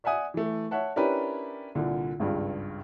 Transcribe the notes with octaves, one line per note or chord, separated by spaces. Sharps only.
D5 E5 F#5 G#5 D#6
E3 A3
C#5 E5 F#5 A5
C#4 D4 E4 G4 A#4 B4
C2 A#2 D3
G#1 C#2 G2